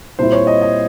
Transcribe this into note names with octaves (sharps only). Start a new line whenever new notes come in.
A#2 G3 C4 E4 C5
C#5
D#5
D#5